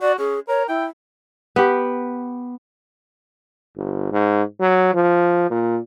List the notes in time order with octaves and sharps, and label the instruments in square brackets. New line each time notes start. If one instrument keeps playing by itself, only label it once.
[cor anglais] F#4 [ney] D5
[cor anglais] C#4 [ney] G#4
[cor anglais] A#4 [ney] C#5
[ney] E4 [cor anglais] G5
[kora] B3 G4
[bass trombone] G1
G#2
F#3
F3
A#2